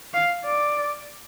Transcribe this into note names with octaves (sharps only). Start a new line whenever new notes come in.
F5
D5